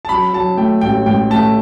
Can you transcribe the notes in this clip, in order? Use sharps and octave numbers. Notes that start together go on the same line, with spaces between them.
A5
F#3 B5
F#3 A5
A3 G5
A1 G5
A1 G5
A3 A5